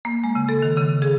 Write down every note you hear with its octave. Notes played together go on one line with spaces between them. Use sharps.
A#3
G#3
C#3
A4
D#3
C#3
G#4